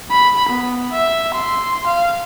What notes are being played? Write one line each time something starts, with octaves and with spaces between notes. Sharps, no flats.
B5
B3
E5
C6
F5